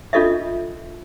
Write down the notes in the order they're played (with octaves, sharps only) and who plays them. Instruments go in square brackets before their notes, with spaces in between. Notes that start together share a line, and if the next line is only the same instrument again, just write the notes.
[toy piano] D4 F4 A4 D#5 E5